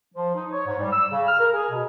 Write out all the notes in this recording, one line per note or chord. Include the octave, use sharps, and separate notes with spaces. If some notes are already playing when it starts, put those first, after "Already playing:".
F3
D#4
C#5
G#2
G3
E6
C#3
F6
A#4
G#4
B2